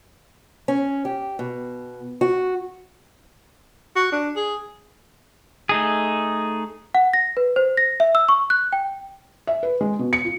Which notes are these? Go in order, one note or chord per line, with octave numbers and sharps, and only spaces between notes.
C#4
G4
B2
F#4
F#4
D4
G#4
A3 D#4 G#4
F#5
A#6
B4
C5
A#6
E5
E6
C#6
F#6
G5
E5
B4
G#3
B2
C#7
F4